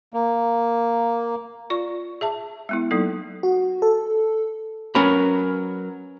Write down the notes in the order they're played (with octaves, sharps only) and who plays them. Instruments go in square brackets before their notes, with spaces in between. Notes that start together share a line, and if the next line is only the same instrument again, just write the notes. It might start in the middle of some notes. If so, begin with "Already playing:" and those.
[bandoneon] A#3
[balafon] F4 D5 C#6
G#4 E5 A5
G#3 B3 E4
F#3 A#3 D#4 A4
[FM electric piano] F#4
A4
[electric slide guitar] F#3 A#4 A#5 [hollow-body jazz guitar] C#4 B4 B5